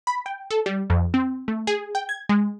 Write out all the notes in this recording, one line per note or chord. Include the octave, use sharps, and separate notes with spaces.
B5
G5
A4
G3
F2
C4
A3
G#4
G5
G#6
G#3